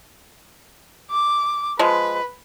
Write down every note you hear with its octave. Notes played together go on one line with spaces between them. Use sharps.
D6
F3 G#3 B4